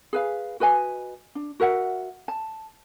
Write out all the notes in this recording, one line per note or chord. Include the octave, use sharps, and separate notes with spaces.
G#4 B4 F5
F#4 B4 D#5 G#5
D4
F#4 A#4 E5 F#5
A5